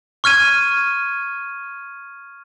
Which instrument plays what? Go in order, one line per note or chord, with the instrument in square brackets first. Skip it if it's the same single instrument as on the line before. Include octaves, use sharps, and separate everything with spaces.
[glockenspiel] C#6 F6 G#6 D#7